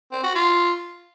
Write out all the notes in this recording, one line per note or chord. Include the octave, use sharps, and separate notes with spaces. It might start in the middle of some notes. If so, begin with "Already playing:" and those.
C4
F#4
F4